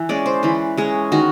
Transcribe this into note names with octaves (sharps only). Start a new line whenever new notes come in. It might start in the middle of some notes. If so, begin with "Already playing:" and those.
Already playing: E3
G#3 C#4 D5
C5
E3 B4
G#3 C#4 G#4
D#3 F#4